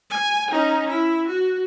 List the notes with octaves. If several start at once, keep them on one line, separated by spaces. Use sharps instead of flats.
G#5
C#4 D#4
E4
F#4